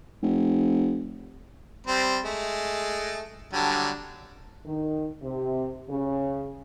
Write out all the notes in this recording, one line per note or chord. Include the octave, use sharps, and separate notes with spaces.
F1
G3 C4
G#3 A3
D3 F#3 G3
D#3
C3
C#3